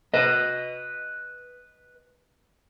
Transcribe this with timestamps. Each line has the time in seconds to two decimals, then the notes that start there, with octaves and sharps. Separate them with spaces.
0.14 B4 D#5